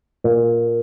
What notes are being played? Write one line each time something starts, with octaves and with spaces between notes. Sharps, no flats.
A#2